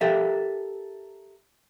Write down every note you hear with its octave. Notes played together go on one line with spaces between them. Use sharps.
G4 A4 A#4 E5